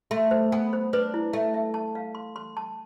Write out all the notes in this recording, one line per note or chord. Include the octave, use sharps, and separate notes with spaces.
A3 C6
C5
B3 G#5
C5
D4 B4
E4
A3 E5
E5
A5
F5
C6
C6
A5